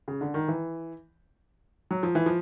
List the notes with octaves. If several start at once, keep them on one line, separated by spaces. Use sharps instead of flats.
C#3
D3
D#3
E3
F#3
F3
E3
F3